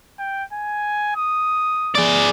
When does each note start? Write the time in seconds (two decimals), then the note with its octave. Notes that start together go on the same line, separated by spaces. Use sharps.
0.19 G5
0.53 G#5
1.16 D#6
1.95 G#4 D5